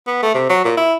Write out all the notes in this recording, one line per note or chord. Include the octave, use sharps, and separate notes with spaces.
B3
A3
C3
F#3
A#2
E4